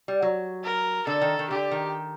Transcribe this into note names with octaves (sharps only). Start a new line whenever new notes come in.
G3
F#3
A#4
D3 A4
D#3
D#3
D3 G4
D#3